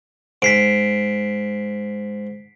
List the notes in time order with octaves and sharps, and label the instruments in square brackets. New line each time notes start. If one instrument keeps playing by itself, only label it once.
[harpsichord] G#2 [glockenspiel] B6 C7 D7